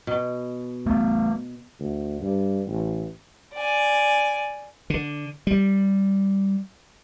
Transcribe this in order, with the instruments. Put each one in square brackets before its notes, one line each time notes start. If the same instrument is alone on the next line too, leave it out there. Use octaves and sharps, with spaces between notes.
[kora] B2
[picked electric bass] A3 B3
[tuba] D2
G2
A1
[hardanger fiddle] D5 G#5
[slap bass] D3
G3